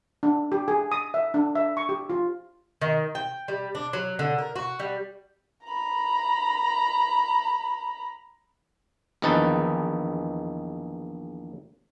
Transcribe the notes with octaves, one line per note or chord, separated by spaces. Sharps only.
D4
G4
G#4
D#6
E5
D4
E5
C#6
G4
F4
D#3
G5
G3
D4
F#3
D3
A#4
F#4
G3
A#5 B5
A#1 E2 D#3 D#4 B4 A5